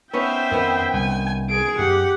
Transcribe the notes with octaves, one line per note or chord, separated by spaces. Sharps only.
B3 C#4 D#4 C5 E5 G5
F2 D#3 B3
C2 G#5
G#4 D7
F#2 G4 F#5